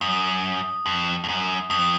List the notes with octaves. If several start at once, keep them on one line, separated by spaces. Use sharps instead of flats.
F#2 D#6
F2
F2
F#2
F2 D#6